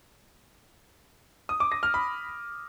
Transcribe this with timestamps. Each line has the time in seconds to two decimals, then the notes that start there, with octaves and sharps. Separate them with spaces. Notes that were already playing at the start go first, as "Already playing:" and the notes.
1.49 D#6
1.60 D6
1.72 A#6
1.83 F6
1.94 B5